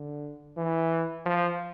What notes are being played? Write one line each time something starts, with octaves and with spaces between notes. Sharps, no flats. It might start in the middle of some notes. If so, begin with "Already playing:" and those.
Already playing: D3
E3
F3